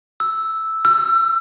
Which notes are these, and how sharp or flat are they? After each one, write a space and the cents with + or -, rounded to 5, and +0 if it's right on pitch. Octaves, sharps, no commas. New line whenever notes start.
E6 -5
E6 +35